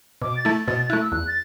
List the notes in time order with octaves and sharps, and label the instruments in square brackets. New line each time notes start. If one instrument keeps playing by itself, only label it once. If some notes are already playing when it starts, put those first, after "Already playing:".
[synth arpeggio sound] B2 [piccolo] D6
[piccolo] A6
[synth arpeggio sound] A3 E4
[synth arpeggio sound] B2 [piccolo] A6
[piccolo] A6
[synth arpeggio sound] A3 E4 [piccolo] F#6
[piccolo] E6
[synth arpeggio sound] E2 [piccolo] F#6
[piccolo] A6